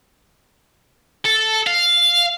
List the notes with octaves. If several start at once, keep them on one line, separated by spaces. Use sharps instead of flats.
A4
F5